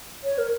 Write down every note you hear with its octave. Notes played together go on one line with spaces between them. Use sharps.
C#5
A#4